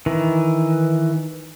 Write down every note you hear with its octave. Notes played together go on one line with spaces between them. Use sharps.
D#3 E3